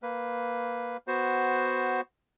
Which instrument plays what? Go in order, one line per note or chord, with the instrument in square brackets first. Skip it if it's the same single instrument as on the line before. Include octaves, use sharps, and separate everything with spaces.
[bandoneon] A#3 B4
B3 F#4 C5